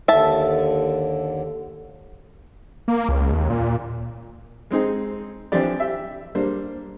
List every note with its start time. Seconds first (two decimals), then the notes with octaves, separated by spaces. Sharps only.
0.08 D#2 D3 E5 A5
2.88 A#3
3.09 C#2
3.32 D#2
3.50 A#2
4.71 G#3 C4 D#4 G#4
5.52 E3 F3 C4 D4 G4 D5
5.80 G4 E5
6.35 G3 A#3 D4 C5